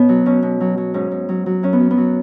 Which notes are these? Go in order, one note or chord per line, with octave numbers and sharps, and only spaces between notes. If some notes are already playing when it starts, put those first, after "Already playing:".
Already playing: B2 B3 C#4
F#3
B2 C#4
B2
F#3
F#3
G#2 C#4
G#2
F#3
F#3
F#2 C#4
B3
F#2
B3
F#3